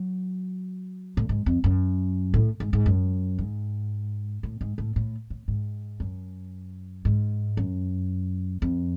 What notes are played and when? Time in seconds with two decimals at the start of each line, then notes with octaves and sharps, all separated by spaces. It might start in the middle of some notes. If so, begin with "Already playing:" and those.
Already playing: F#3
1.17 A2
1.29 G#2
1.46 F2
1.64 F#2
2.34 A2
2.60 G#2
2.73 G#2
2.86 F#2
3.38 G#2
4.43 A2
4.61 G#2
4.78 A2
4.96 A2
5.30 A2
5.48 G#2
6.00 F#2
7.05 G#2
7.57 F#2
8.62 F2